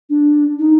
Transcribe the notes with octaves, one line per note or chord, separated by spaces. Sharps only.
D4
D#4